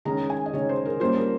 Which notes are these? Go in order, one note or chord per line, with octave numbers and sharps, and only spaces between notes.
D#3 G#3 C#4 A#5
G#5
D#5
D#3 G#3 C#4 C#5
C5
A#4
G3 A#3 C#4 F4 C5
A#4